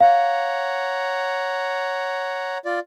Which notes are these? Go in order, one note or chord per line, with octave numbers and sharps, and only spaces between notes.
C#5 F5 F#5 A#5
F4 D5